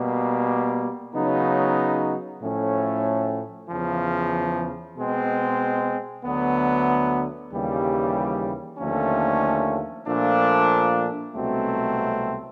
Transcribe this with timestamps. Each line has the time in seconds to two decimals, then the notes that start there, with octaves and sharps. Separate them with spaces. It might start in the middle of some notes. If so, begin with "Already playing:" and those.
Already playing: B2 G3 A#3
1.13 C#3 F#3 B3 D#4
2.41 A2 F3 A3 C#4
3.68 E2 C#3 F3
4.96 B2 G#3 C4
6.24 D2 D3 F#3 B3
7.52 D#2 C#3 E3 G3
8.78 D#2 D3 F3 A3 C#4
10.07 A#2 F3 A3 D4
11.35 C2 B2 F#3 A3 C4